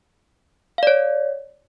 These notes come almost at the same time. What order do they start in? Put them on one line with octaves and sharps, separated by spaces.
F5 D5 C#5